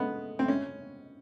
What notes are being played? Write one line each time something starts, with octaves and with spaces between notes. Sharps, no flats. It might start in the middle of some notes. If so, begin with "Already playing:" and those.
Already playing: G#3 A3 B3
C4
C#4